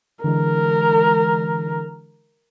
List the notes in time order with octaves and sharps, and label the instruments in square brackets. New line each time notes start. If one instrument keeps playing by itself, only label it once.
[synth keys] D3 E3 G#3 [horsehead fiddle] A#4